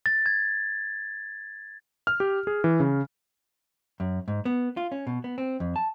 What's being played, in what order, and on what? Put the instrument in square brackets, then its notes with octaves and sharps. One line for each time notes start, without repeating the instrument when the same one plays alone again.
[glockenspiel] A6
G#6
[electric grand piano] F6
G4
G#4
E3
C#3
[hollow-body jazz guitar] F#2
G#2
B3
F4
C#4
B2
B3
C4
F2
A5